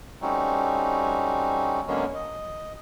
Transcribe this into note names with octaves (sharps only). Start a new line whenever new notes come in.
G3 A3 C4 C#4 D#4 F#4
D3 F#3 G#3 A#3 B3 C#4
D#5